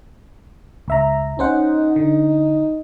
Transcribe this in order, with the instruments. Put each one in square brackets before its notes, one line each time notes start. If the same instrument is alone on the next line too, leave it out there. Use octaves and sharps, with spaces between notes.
[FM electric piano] C#2 E5 A#5
[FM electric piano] C#4 C5 F#5 [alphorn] D#4
[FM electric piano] D3